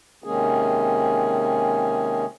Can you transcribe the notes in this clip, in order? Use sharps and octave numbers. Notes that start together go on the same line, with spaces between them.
C3 D#3 G#3 A#3 C#4 G#4